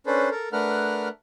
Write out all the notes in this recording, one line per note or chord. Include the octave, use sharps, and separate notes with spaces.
C#4 D4 A4 B4 C5
A4 A#4
A3 D4 A#4 B4 F#5 F6